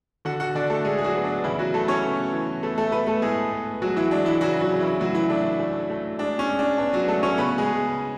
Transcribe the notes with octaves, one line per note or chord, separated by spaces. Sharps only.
D3 F#4 F#5
F#4 F#5
D3 D4 D5
A3 A4
G#3 G#4
G#4
F#3 F#4
B3
D4
C#3 E3 E4
F#3 F#4
C#3 A3 A4
C#4 C#5
B3
E3
A3 B3 A4
A3 A4
B3 B4
A3 A4
A2 G#3 G#4
B3
F#3 G#3 F#4
E3 E4
G#3 D4
E3 E4
C#3 F#3 F#4
F#3 F#4
C#3
E3 E4
A2 F#3 F#4
E3 E4
A3 D4
A3
A3
G#3 D4
C#4
G#3
D4
B3 D4
F#3 F#4
G#3 A3 A4
C#4 C#5
C#3 B3 B4
G#3 G#4